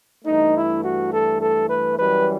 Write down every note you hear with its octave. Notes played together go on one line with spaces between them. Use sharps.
G2 E3 A3 D#4
E4
F#4
A4
A4
B4
F#2 E3 G3 B4